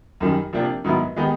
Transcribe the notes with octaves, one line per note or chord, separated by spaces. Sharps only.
F#2 D#3 G3
C3 F3 A#3 D4 G4
G#2 D#3 F#3 B3 E4
D#3 G#3 B3 D#4 G4